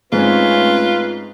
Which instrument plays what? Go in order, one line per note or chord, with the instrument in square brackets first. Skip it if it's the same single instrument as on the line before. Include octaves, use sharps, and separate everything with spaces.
[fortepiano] G#2 [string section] A3 C4 C#4 [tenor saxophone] F4 [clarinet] B4